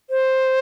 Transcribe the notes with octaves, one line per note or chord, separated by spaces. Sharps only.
C5